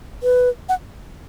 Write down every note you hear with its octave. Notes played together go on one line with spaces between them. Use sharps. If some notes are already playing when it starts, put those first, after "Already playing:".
B4
F#5